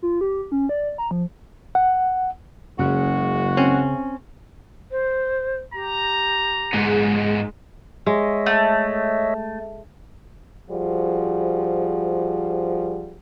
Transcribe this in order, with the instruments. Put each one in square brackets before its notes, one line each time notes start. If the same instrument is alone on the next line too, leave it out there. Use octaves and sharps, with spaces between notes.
[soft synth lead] F4
G4
C#4
D5
A#5
F3
[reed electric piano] F#5
[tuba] F#1 [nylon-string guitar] C#3 [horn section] G#3 F#4
[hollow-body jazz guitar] C4 C#4
[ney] C5
[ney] G4 [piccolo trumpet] A#5
[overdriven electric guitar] G#2 B3 [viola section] G#3
[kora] G#3 [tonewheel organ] C#5 D#5 E5
[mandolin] A3
[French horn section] F3 G3 F#4 G#4 C5